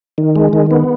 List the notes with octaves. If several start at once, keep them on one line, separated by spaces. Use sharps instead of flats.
D#3
G#3
D#3
B3